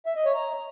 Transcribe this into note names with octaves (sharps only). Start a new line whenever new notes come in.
E5
D#5
C#5
A#5